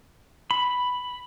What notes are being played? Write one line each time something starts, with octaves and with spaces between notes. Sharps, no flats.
B5